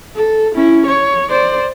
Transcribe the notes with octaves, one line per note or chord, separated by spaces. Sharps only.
A4
C#4 E4
C#5
C5 D5